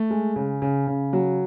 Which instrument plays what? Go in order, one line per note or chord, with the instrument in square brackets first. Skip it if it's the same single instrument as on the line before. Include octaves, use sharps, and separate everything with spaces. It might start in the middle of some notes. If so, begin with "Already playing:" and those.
Already playing: [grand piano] A3
G#3
C#3
C#3
C#3
F#3